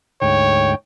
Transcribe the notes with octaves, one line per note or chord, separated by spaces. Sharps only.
D2 G#2 C#5 G5